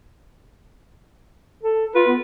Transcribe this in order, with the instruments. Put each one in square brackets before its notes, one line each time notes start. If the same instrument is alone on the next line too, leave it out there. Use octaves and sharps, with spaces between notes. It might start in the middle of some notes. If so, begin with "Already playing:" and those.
[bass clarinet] A4
[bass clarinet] F4 [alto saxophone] B4
[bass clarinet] B3